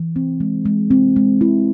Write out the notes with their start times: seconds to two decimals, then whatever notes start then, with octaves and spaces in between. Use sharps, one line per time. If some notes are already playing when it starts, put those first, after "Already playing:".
Already playing: E3
0.16 C4
0.40 G#3
0.66 G#3
0.91 C4
1.16 G#3
1.41 E4